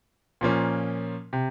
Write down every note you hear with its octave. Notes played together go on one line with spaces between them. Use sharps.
A#2 F3 A#3 C#4
C3